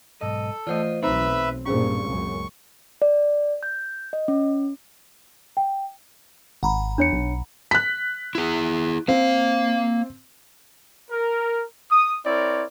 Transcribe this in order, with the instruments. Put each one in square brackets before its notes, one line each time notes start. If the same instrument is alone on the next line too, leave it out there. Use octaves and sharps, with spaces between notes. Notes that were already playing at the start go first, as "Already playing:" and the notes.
[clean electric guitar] B1 G#2 D#5 [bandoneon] A4
[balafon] E3 A3 [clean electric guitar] F4 C5 D#5
[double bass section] B1 [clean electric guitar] C4 [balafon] D#4 C5 A#5 [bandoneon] B4 E5
[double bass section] A#1 G2 A#2 [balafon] C#4 G#4 C5 [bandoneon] C#6
[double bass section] C#2 F#2
[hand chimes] D5
G6
D#5
C#4
[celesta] G5
[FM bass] G#1 [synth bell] F#5 A#5 B5
[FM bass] E2 [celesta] D4 C#5 C#7
[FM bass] B1
[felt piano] F#6 B6
[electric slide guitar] E4 G#4
[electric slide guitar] A#3 F5 [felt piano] C4
[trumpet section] A#4
D#6
C4 E4 A#4 C#5 D5